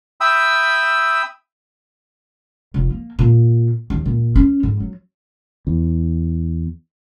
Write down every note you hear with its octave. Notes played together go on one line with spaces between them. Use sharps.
E5 G5 B5 D#6 E6
F1
A#3
A#2
D#2
A#2
C#4
G#2
F#3
E2